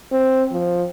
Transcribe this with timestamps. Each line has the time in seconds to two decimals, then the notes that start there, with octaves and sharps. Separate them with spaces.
0.12 C4
0.52 F3